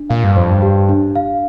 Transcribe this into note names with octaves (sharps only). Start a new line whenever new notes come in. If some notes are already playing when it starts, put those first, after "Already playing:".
Already playing: D4
A#2 F5
G2
F2 C5
G2
G4
D4
F5